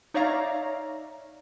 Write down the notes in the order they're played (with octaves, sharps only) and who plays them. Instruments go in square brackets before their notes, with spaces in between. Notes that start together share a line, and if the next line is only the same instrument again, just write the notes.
[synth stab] D#4 C#5 D5 E5 F5 A#5